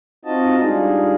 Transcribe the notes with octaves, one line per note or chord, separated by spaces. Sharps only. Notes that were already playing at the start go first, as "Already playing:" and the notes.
C4 D#4 F4 F#4 D#5 A5
G3 G#3 D4 D#4 F4 G#4